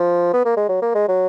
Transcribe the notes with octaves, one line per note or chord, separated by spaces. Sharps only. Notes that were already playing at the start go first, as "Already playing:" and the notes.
Already playing: F3
B3
A#3
G#3
F#3
A#3
G#3
F#3